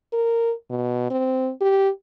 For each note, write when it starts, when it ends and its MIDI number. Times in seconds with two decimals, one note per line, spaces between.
0.13 0.53 70
0.70 1.06 47
1.11 1.51 60
1.61 1.89 67